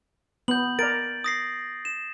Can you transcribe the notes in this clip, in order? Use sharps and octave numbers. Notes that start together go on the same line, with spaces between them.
B3 G6 F#7
A#4 D5 A6 D7
D#6 A#6 C7
E7